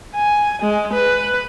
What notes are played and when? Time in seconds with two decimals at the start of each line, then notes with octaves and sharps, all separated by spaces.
0.15 G#5
0.62 G#3
0.93 B4